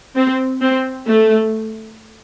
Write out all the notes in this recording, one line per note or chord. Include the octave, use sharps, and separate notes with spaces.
C4
C4
A3